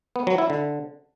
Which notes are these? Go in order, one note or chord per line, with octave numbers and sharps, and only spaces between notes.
B3
F#3
E4
D3